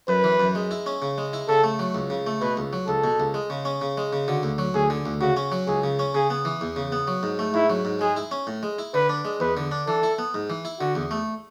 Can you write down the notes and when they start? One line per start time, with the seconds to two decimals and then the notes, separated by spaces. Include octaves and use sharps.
0.08 F#2 B4
0.24 E3
0.40 F#2
0.55 G#3
0.71 E4
0.86 C#4
1.02 C#3
1.18 G#3
1.33 E4
1.49 C#3 A4
1.64 A3
1.79 F#3
1.95 C#2
2.10 C#3
2.27 A3
2.41 B2 B4
2.57 C#2
2.73 F#3
2.88 C#2 A4
3.04 B2
3.20 C#2
3.34 G#3
3.50 C#3
3.65 C#4
3.81 C#3
3.97 G#3
4.13 C#3
4.28 D3 F#4
4.43 D2
4.58 F#3
4.74 D2 G#4
4.90 D3
5.06 D2
5.21 C#3 F#4
5.37 C#4
5.52 F#3
5.67 C#2 G#4
5.84 C#3
5.99 C#4
6.14 C#3 G#4
6.30 B3
6.45 E3
6.61 E2
6.76 C#3
6.92 B3
7.08 F#3
7.23 G#2
7.39 A3
7.54 G#2 E4
7.70 F#3
7.85 G#2
8.01 G#3 G#4
8.16 E4
8.31 C#4
8.47 A2
8.63 G#3
8.79 E4
8.94 D3 B4
9.09 D4
9.25 G#3
9.40 E2 B4
9.57 D3
9.72 D4
9.87 E3 A4
10.03 E4
10.19 B3
10.34 G#2
10.50 E3
10.65 E4
10.80 D3 F#4
10.95 E2
11.11 A3